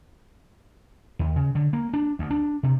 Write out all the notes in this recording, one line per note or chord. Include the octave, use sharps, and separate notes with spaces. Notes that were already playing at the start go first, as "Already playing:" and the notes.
D#2
C#3
D3
A#3
D4
D2
D4
C3